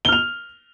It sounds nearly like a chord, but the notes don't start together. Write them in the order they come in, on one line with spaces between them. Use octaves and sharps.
G7 F6 F7